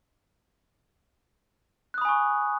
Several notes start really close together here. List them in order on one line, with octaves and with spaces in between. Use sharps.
F#6 D#6 B5 G#5 C#6